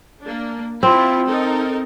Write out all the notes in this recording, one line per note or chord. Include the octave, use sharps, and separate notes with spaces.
A#3 D4
C4 E4 F4
D#4 A4 A#4